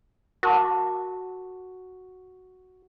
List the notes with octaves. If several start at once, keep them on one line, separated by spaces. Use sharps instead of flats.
F#4 A#4 A5 D6